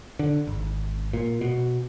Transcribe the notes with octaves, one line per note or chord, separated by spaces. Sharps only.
D3
G#1
A#2
B2